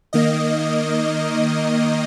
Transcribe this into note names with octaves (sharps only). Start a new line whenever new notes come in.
D#3 A#3 D#5